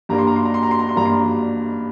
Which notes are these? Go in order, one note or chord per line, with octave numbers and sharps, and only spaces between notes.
G2 G3 A#3 D4 A#5
C6
A#5
C6
A#5
C6
A#5
C6
A#5
C6
G2 G3 A#3 D4 A#5
C6
A#5